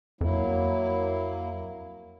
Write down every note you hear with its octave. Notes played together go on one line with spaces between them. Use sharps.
F2 F#3 A#3 E4